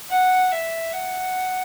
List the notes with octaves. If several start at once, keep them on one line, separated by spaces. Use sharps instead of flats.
F#5
E5
F#5